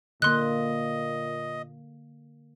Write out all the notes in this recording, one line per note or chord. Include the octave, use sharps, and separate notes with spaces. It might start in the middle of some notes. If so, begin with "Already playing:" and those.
A#2 D3 A#3 D#5 C6 F#6